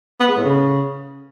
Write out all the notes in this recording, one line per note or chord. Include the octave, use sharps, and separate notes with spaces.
B3
G#3
A2
C#3